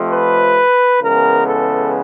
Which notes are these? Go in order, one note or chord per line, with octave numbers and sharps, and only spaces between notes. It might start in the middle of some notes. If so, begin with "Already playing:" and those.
Already playing: F2 C3 F3 A3
B4
C#3 E3 G#3 B3 A#4
A4